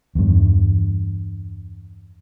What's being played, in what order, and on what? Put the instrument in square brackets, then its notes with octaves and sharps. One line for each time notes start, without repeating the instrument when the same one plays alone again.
[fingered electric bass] E2 G2